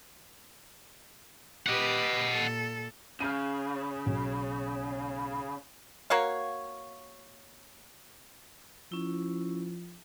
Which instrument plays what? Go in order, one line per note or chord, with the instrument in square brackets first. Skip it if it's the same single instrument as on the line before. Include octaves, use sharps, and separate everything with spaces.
[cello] G4 B4 [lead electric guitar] D#5 F#5
[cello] A#2 A4
[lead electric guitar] C#3 [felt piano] F6 G6 D#7
[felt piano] B1
[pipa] A#3 F#4 C#5 F5
[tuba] F3 [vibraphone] C#4 E4